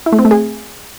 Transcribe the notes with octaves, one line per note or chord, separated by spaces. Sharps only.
E4
A3
C4
A3
G#4